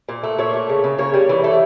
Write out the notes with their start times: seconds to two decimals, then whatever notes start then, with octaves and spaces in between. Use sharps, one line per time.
0.09 A#2
0.23 A3
0.38 A#2 C#5
0.54 A3
0.69 C#3
0.84 C#3
0.98 A#3 C#5
1.14 G3
1.29 E3
1.44 A3